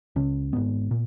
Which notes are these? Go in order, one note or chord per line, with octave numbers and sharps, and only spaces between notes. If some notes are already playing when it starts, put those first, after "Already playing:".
C#2 C#3 C#4
G#1 G#2 B3
A#2